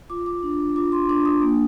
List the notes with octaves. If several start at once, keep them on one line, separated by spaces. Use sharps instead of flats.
F4 D6
D6
D4
F4 D6
C6
D4 D6
D#6
A#3